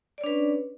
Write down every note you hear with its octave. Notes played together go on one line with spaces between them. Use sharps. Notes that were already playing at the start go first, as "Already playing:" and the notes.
C#4 D4 B4 C#5 D5